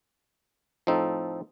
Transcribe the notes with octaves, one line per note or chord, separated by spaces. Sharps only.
A2 F3 C4 D#4 A4